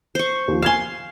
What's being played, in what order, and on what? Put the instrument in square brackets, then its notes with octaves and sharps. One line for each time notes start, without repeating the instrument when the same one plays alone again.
[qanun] C5 C#6
[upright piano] D#2 F3
[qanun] F5 C6 [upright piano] G#5 G#6 E7